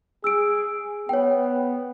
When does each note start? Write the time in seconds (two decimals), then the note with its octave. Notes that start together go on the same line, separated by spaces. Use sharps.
0.24 G#4 E6 D7
1.09 B3 C#5 G5